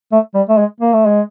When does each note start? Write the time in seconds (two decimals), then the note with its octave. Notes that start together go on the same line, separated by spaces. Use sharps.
0.12 A3
0.35 G3
0.49 A3
0.58 G#3
0.81 A#3
0.93 A3
1.07 G#3